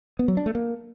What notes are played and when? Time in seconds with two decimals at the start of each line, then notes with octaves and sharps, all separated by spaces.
0.19 B3
0.28 F#3
0.37 D4
0.46 A3
0.55 A#3